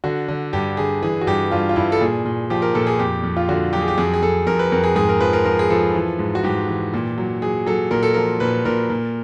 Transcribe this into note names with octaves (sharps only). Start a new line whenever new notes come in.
D3 F#4
D3
G2 G4
D3 G#4
E3 G#4
F#4
G2 G4
G2 F4
F4
G2 E4
A4
A#2 G#4
A#2
F3 G4
A#4
A#2 A4
G#4
F2 G4
F2
F4
D3 F#4
F#3 G4
G#4
G4
F2 G#4
G#4
F2 A4
F2 A#4
B4
F2 A#4
G#4
G#2 G#4
A#4
F3 B4
A#4
F3 A#4
G#4
F3 A4
E3
G#2
F#4
G#2 G4
E3
A#2
F#3
F#3 G#4
F#3 A4
A#2 A#4
A4
F3 A#4
A#2 B4
A#2 A#4
A#2